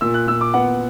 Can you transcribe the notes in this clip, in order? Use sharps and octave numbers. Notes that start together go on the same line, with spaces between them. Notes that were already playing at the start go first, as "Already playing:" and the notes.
A#2 E6
F#6
A#2 E6
D6
B3 F#5